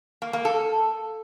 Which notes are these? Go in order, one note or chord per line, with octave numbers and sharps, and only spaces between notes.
A#3
A#3
A4